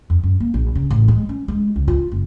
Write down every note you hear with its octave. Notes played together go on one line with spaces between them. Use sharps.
F2
F#2
A#3
A#1
C#3
A1
G#3
C#4
G#3
C#2
F4
F#1